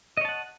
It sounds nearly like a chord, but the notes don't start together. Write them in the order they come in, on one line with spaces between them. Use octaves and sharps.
D#5 C#5 A5 F#5